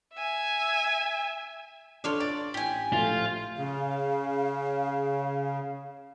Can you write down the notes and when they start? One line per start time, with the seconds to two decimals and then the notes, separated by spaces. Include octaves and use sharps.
0.14 E5 G#5
2.04 D4 F4 A4 C#5 D5
2.20 D5 A6
2.54 A1 G4 G#5
2.93 A#1 A2 A3 F4
3.57 C#3 F5